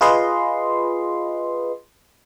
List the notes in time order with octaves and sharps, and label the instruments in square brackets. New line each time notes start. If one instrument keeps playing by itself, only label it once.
[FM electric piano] F4 G#4 B4 D#5 C6